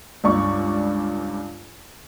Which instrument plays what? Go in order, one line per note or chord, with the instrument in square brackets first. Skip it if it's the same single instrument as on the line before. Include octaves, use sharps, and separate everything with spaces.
[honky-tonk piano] C#2 G2 D5 C#6